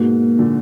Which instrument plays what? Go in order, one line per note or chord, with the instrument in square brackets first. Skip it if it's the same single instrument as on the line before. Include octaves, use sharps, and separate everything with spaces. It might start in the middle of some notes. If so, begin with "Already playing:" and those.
Already playing: [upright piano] G#2 B2 [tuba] A#3
[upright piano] A#2 D3